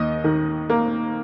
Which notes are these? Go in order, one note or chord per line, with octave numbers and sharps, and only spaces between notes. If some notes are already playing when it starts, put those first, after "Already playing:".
Already playing: D#2 D#5
D#3
A#3